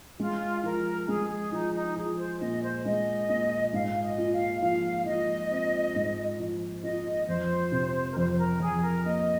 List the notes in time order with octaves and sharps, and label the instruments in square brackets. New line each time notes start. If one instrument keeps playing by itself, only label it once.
[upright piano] G#3 [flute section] F4
[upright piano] F3 [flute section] A#4
[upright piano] G#3 [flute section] G#4
[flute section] G#4
[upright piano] F3 [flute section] D#4
[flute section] D#4
[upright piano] F3 [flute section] G#4
[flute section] C5
[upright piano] A#2 [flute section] D#5
[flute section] C5
[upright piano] G#3 [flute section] D#5
[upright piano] A#2
[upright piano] G#2 [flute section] F5
[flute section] D#5
[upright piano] F4
[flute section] F5
[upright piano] F3 [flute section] F5
[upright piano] F3 [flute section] D#5
[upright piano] C4
G#2
F3
[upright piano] F4 [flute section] D#5
[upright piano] F2 [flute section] C5
[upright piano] C3
[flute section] A#4
[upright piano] F2 [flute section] C5
[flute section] C5
A#4
[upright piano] F2 [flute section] G#4
[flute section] A#4
[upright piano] A#3 [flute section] D#5